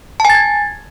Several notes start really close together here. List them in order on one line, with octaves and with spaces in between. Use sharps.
A5 G#5 A6 G#6